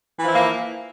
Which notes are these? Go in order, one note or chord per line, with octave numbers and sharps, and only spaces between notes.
E3 F3 A#3 E4